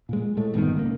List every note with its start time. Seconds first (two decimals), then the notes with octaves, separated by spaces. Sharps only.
0.09 A#2 G#3
0.37 A2 G#3 A3
0.54 G1 A#2 D#3 B3
0.77 C#2 A#3